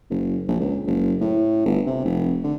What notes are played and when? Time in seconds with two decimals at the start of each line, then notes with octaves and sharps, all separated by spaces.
0.10 F#1
0.48 A#1
0.60 C#2
0.87 F#1
1.21 A2
1.65 G1
1.86 C3
2.05 F1
2.44 D3